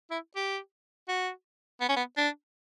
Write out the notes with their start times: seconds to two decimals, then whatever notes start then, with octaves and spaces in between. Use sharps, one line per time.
0.11 E4
0.36 G4
1.08 F#4
1.81 B3
1.89 C#4
1.97 B3
2.17 D4